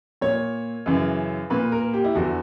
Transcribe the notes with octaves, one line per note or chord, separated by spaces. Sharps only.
A#2 C#5
F#2 C#3 E3
A#2 B4
A#4
G4
E4
E2 D3 F#4